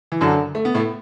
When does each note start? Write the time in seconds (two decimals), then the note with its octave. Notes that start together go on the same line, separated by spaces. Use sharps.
0.12 E3
0.21 F#2 D3 F#3
0.55 A3
0.65 B3
0.74 A2 A3